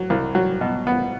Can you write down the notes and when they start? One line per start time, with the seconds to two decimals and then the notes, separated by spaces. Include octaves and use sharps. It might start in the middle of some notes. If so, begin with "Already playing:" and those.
Already playing: F#3
0.10 C2
0.35 F#3
0.61 B2
0.87 B3